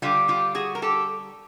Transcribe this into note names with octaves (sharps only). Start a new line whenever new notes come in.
D3 G3 F4 G4
F4 G4
F#4 G#4
A#4
G4 A4